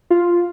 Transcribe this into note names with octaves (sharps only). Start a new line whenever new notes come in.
F4